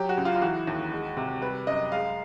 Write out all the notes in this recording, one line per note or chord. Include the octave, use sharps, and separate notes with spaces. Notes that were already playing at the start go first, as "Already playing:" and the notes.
Already playing: F#3 G4
F#4
C#2
F4
F4
E3 F#4
D#2
G#3
C3
G3 B4
F#2 D#5
G#3 F5